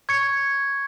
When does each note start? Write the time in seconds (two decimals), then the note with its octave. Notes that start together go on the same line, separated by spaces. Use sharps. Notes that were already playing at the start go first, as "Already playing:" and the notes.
0.09 C#6 G#6 C#7